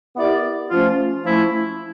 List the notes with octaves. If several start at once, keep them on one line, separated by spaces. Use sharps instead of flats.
B3 E4 G4 A#4 D5
F3 A3 C#4 F4
F3 A3 C#4 E4